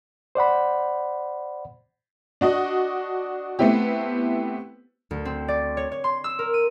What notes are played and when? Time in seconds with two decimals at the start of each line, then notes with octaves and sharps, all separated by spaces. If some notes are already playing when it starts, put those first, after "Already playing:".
0.35 C5 D5 F#5 B5
2.41 D4 F#4 D#5
3.59 A3 B3 C4 E4 G4
5.11 D2
5.25 C4
5.48 D5
5.77 C#5
5.92 C#5
6.04 C6
6.24 E6
6.39 A#4
6.54 D#7